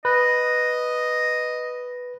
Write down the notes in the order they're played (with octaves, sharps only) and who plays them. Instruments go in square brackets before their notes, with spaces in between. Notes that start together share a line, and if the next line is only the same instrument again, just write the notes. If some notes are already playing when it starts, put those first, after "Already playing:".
[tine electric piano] B4 [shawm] D#5